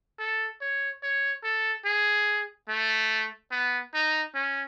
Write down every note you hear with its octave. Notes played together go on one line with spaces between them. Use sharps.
A4
C#5
C#5
A4
G#4
A3
B3
D#4
C#4